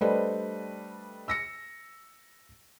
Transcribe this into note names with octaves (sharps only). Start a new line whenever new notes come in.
G3 A3 D4 B4 C5 D#5
E6 A#6 C#7